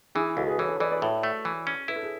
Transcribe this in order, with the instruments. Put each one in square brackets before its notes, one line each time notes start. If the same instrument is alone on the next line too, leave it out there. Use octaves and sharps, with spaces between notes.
[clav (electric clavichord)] E3 [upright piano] E4 G#4
[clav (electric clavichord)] C#2 [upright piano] F#4 A4
[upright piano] G#4 B4
[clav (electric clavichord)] E3 [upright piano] A4 C#5
[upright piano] A4 C#5
[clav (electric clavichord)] E3 [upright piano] B4 D5
[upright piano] B4 D5
[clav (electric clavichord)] A2 [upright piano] A4 C#5
[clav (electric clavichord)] A3
E3
C#4
[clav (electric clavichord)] E4 [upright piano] B4
[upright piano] A4
G#4